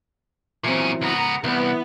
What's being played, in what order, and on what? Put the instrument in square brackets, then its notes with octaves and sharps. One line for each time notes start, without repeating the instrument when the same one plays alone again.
[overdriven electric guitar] A#2 C#4 [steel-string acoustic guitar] E3 F#3 C4
[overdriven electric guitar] C#2 B3 [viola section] A#5
[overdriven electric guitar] C2 [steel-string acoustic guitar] E3 [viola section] B3